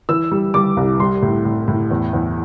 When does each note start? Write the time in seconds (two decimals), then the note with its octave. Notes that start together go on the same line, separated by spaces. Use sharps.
0.09 E3 E6
0.32 G3
0.54 G3 D6
0.77 C2
1.00 G3 C6
1.22 A2
1.45 A2
1.68 A2
1.90 E2
2.13 E2